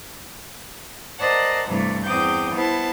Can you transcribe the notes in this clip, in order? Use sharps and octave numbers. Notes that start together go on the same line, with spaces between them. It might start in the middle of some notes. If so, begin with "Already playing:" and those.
A#4 C5 D5 D#5 F#5 A5
G2 C3 E3 A3
E2 C4 G5 D6 D#6 G6
B3 E4 C5 A5